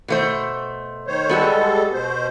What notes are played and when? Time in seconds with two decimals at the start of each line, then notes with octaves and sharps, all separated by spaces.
0.08 B2 A3 C5
1.07 D#3 C5 C#5
1.29 G3 G#3 B3 F#4 G4 A4
1.93 B2 C5